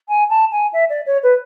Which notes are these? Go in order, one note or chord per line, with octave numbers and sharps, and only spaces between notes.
G#5
A5
G#5
E5
D5
C#5
B4